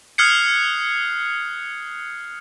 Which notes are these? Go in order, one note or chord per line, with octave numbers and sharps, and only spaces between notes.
D#6 F6 F#6 G#6 C7 C#7